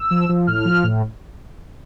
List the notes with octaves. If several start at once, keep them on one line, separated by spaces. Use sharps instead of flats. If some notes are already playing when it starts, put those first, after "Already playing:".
Already playing: E6
F3
F3
A2 F6
F3
A2